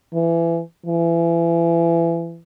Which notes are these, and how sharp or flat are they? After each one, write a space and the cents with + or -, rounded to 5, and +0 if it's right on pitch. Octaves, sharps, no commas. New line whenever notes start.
E3 +25
E3 +30